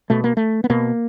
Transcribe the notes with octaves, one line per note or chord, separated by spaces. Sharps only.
B2 A3
A#3
A3
B3
B2 A#3